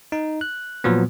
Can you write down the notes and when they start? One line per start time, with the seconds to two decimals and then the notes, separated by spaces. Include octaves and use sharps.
0.12 D#4
0.41 F#6
0.84 A#2 F3 F#3 B3